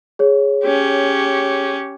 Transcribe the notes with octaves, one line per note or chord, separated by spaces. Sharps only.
G#4 C#5
C#4 G4